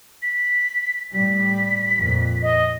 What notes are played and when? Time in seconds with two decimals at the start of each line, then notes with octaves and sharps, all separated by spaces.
0.23 B6
1.14 A2 G3 B6
1.96 F2 A#2
2.42 D#5